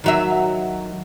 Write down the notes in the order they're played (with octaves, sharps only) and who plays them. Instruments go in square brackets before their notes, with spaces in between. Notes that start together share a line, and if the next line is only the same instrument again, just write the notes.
[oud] D#3 F#3 E5